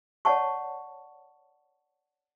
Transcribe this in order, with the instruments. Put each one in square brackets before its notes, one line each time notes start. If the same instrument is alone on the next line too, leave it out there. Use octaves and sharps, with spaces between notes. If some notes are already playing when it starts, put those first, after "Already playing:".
[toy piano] C#5 D5 F#5 A5 C#6